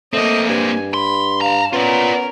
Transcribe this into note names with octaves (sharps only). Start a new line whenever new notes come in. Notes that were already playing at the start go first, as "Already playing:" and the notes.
A3 A#3 C4 D#5
G2 G#5
B5 C6
F5 A5 A#5
B3 C#4 F4 A#4 D5